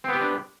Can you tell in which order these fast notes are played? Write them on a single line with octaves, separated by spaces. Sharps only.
C4 B3 G4 B4 D4